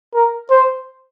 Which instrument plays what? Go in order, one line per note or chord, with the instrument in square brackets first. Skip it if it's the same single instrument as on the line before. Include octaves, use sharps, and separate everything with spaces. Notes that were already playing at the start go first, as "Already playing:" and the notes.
[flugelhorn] A#4
C5